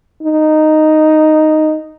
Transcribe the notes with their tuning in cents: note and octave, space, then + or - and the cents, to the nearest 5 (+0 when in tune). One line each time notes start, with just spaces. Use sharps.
D#4 -5